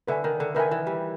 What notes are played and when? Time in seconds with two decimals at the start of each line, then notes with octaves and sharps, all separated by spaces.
0.08 D3 B4 E5 G#5
0.24 D#3
0.40 D3
0.55 D#3 B4 E5 G#5
0.71 E3
0.87 G3